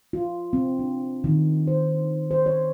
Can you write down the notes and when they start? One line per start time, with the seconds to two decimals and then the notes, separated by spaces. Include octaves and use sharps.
0.13 F4
0.53 C4
0.79 D4
1.24 D#3
1.67 C5
2.31 C5
2.46 C#5